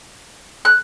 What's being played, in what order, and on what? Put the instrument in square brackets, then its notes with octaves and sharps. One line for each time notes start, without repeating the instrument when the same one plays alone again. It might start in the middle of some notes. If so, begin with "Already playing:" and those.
[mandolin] F#6